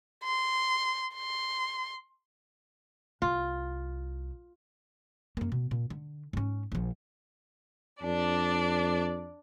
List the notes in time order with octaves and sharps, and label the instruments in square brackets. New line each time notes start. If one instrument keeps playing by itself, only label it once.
[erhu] C6
C6
[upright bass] C2 [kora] F4
[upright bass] F#2 A#3
B2
A#2
D3
G#2 C#4
A#1 F3
[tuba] F2 [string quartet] D4 D5